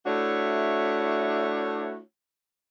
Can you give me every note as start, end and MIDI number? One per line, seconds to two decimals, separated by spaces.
0.06 1.99 57
0.06 1.99 62
0.06 1.99 64
0.06 1.99 66
0.06 1.99 73